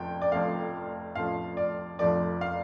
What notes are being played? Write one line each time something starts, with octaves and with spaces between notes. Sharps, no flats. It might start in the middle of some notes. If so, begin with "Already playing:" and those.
Already playing: F1 F2 F3 G5
D5
F1 F2 F3 A3 F5
F1 F2 F3 A3 F5
D5
F1 F2 F3 A3 D5
F5